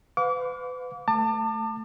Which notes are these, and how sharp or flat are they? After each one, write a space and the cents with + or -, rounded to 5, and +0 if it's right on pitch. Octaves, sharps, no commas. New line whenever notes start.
B4 +35 F5 +40 D6 -35
A3 +0 A5 +30 D6 +35